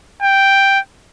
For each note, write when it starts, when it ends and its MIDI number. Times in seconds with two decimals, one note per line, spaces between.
0.22 0.79 79